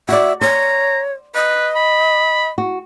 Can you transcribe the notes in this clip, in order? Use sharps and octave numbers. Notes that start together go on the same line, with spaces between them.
F#4 D5 E5
C5 C#5 A#5
B4 D#5
B5
F#4